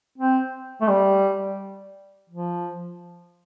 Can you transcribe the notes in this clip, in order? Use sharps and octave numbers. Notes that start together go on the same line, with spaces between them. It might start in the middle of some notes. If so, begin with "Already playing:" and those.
C4
A3
G3
F3